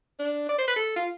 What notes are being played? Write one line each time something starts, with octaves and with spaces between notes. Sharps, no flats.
D4
D5
C5
B4
A4
F4